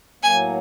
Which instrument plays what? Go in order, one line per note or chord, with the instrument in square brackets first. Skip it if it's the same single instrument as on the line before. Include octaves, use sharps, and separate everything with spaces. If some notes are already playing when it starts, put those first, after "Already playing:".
[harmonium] A2 F#3 A#3 [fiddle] G#5